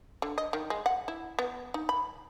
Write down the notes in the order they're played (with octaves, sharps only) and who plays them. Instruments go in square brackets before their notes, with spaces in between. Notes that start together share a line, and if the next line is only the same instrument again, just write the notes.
[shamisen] D3
D#5
D#3
G#3
F#5
E4
B3
D#4
B5